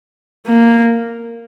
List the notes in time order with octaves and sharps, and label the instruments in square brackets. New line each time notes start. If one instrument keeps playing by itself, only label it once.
[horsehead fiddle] A#3